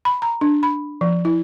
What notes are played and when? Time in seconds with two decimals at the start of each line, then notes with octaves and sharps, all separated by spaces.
0.05 B5
0.22 A#5
0.41 D4
0.63 B5
1.01 F3
1.25 E4